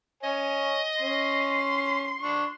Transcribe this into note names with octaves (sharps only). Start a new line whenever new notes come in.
C#5 D#5 G#5
C#4 C6
D4 C#6